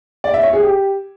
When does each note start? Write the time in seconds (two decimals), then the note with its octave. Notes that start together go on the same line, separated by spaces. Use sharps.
0.24 D5
0.34 E5
0.43 C#5
0.53 G#4
0.63 G4